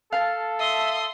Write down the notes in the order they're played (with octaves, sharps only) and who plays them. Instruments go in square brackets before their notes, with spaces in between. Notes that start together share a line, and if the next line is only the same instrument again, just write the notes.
[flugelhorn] A4 [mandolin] F5 A5
[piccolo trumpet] E5 [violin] C6 D#6